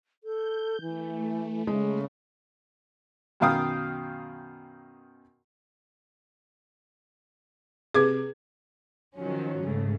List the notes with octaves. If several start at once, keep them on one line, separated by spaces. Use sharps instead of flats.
A4 G6
E3 A3
C#3 G#3
F#2 B2 D#3 F5 G5 D#6
C3 G#4 B4 D6 G#6
D#3 F3 F#3 C#4
G#2 C#3 A3